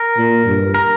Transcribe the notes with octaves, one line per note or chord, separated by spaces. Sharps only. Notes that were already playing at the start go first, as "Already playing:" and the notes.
Already playing: A#4
A#2
G2
A#4